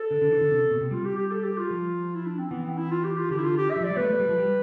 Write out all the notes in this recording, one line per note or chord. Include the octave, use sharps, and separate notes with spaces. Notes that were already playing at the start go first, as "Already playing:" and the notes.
Already playing: A4
D3
D3
E3
D3
C3
B2
C3
G3 F4
G4
G4
A4
G4
F4
F3
E4
D4
C4
E3 B3
C4
E4
F4
G4
F4
D3 G4
E4
F4
G4
E5
E3
F3 D5
G3
A3 B3 B4
A3
G3
F3
G3